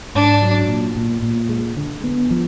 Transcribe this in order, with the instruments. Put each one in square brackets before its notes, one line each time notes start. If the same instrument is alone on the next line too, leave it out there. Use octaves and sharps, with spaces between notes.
[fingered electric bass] G#2 [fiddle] D4
[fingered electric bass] F#3
A#2
A#2
A#2
G#3
D3
B3
F3